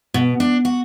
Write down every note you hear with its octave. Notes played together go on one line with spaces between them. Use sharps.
B2
D4
F#4